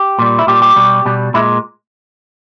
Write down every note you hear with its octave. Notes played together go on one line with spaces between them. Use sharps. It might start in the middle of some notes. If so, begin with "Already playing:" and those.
Already playing: G4
A#2 G3
E4
A#2 G3 G4
G4
B2 G3
B2 G3
A#2 G#3 E4